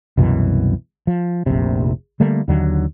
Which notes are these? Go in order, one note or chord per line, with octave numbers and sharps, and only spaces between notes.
C2 F#2 B2 E3
F3
F1 A#1 C3
D3 G3 A3 A#3
D#2 D3 F#3